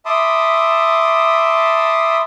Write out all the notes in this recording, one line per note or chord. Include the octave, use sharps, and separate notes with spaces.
E5 A5 B5 C6 D6 D#6